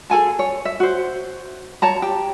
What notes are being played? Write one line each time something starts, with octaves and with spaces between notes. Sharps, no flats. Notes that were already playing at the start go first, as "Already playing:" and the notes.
G#4 A4 G#5 A5
C#5
E5
F#4 C5
C#5 A5 A#5
G4